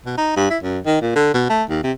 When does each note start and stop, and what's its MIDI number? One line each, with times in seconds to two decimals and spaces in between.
0.06 0.15 47
0.18 0.33 63
0.37 0.47 43
0.50 0.58 64
0.63 0.79 42
0.85 0.99 51
1.01 1.11 46
1.16 1.32 50
1.34 1.46 47
1.50 1.63 57
1.70 1.83 39
1.83 1.92 48